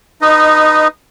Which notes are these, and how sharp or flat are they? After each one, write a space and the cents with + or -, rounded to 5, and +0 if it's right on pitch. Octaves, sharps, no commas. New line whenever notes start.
D#4 -15 B4 +0 D#5 +0